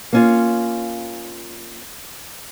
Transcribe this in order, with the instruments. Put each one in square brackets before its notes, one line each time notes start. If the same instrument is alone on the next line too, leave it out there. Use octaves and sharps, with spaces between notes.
[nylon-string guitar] A#3 C#4 F4